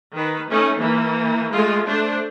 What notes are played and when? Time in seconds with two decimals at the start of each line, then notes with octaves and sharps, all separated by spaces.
0.15 D#3 B4
0.49 A3 C#4 D#4
0.78 E3 A#3
1.51 G#3 A3 F4
1.85 A3 D4 C5